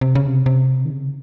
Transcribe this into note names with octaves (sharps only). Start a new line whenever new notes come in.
C3
C#3
C3
C3
D#3
C#3